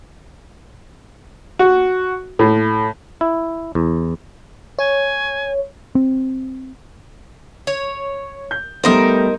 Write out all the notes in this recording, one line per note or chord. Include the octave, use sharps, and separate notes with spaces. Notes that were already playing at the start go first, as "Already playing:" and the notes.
F#4
A2
E4
E2
C#5 G#5
C4
C#5
G6
G3 A3 B3 D#4 A#4 C5